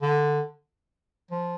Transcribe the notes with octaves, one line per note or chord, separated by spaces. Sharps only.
D3
F3